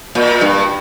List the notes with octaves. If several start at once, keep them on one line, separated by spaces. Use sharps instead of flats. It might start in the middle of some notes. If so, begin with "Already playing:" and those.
A#2
G2